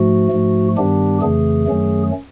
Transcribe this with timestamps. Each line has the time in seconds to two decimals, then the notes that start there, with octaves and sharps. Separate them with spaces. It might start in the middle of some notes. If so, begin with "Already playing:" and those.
Already playing: G#2 F3 A3 F#4
0.32 G#2 F3 A3
0.77 G2 D#3 G3 B3 D4 G4
1.21 F2 C#3 E3 A3 G#4
1.67 F#2 D#3 F#3 A3 C#4